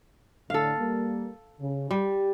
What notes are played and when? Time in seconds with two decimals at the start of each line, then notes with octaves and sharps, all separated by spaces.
0.50 A2 D3 A4 F5
0.79 G3 A#3
1.60 C#3
1.91 G3 G4